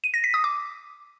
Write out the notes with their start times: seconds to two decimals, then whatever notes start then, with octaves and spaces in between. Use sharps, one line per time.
0.04 D#7
0.14 A#6
0.24 B6
0.34 D#6
0.44 D6